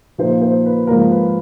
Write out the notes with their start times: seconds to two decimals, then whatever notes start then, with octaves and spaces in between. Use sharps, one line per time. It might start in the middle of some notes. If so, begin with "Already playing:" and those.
0.18 A#2 F3 A#3 D#4 C5
0.42 C5
0.65 B4
0.87 G#2 F3 A#3 A#4
1.11 B4